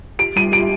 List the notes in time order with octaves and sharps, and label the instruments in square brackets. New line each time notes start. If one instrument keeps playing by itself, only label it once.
[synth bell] G4 [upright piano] D7
[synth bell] G3 [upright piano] D#7
[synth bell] G4 [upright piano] D7